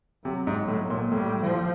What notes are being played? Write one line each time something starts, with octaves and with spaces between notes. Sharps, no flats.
C3 F#3
G#2
A2
A#2
A2 G3
F3